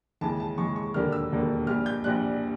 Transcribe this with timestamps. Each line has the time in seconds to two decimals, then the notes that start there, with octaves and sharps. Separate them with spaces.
0.21 D#2 C#3 E3 G#3 A5
0.40 A5
0.58 D#2 C#3 E3 G#3 C#6
0.76 C#6
0.94 E1 D#2 D3 G3 A#3 F6
1.12 E6
1.31 E1 D#2 D3 G3 A#3
1.67 A#1 A#2 G3 F6
1.86 G6
2.04 A#1 A#2 G3 F#6